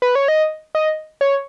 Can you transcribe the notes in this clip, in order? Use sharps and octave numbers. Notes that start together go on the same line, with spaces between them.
B4
C#5
D#5
D#5
C#5